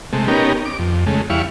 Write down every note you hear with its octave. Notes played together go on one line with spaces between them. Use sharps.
C3 G#3 A3
B3 C#4 D#4 G4 A#4
D6
F2
C#3 G#3 A3
E2 G3 E4 F5 C#6